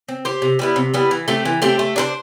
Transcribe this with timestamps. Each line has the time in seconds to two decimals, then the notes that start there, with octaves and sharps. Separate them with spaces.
0.09 C4
0.25 G4 C5
0.42 C3
0.59 G3 B3 E4
0.76 C3
0.94 G3 B3 E4
1.11 E3
1.28 A3 C4 G4
1.45 E3
1.62 A3 C4 G4
1.79 A3
1.96 D4 A4 C5